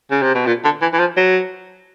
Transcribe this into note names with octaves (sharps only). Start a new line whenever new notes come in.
C#3
C3
B2
A#2
D3
E3
E3
F3
F#3